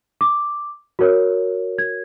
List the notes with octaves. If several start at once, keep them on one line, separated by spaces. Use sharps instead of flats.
D6
F#4 A#4 C#5
G#6